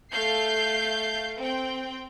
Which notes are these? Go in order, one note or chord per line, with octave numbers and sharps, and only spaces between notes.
A3 F5 G6 C7
C4 G5